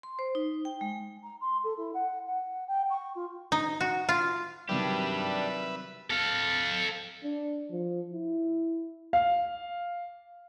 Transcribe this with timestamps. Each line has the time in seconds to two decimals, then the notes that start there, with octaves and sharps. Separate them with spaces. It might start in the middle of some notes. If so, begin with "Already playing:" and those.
0.03 C6
0.19 C5
0.35 D#4
0.65 G5
0.81 G#3
1.23 A#5
1.41 C6
1.64 A4
1.77 E4
1.93 F#5
2.26 F#5
2.67 G5
2.90 C#6
3.15 F4
3.52 D#4
3.81 F#4
4.09 F4
4.69 C3 D#3 F#3 G3 D4 G4 B4 E5
6.10 A4 F5
7.24 D4
7.71 F3
8.13 E4
9.13 F5